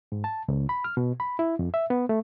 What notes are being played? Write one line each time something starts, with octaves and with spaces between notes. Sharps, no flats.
G#2
A5
C#2
B5
F6
B2
B5
E4
F2
E5
B3
A3